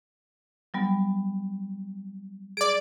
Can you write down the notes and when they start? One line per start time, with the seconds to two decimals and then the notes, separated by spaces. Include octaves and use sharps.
0.74 F#3 G3 B3
2.57 G#4 D5 D7